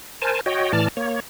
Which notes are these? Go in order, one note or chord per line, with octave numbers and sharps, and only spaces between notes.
A#4 C5 G#5 A5
F#4 C#5 D#5 G5
A2 E3 D5 A5 F6
A#3 C#5